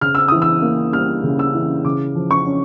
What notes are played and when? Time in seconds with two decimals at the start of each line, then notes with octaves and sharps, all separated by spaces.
0.01 C#3 F6
0.15 E6
0.28 E3 D#6
0.42 E6
0.62 A#3
0.93 G3 F6
1.23 C#3
1.39 E6
1.55 E3
1.85 C#3 D6
2.15 F3
2.31 C#6
2.46 C#4